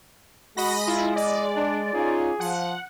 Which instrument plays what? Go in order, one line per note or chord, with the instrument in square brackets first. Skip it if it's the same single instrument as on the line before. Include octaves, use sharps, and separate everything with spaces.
[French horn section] G#3 [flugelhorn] F#4 [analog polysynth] D#5 B5 A#6
[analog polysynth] E4 [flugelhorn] F4
[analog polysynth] D5 [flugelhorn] D#5
[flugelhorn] D4
[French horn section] C#4 D#4 F4 [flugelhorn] G#4
[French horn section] F3 [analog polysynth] F#5